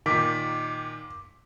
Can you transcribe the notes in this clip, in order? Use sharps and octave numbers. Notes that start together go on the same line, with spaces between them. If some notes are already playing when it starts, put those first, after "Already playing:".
A#2 D#3 D6 B6